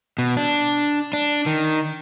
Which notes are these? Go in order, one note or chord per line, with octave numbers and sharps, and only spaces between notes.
B2
D4
D4
D#3